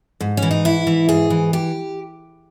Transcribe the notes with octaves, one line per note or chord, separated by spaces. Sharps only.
G#2
C#4
E3
D#4
G#2 E4
E3
G#2 G#4
E3
G4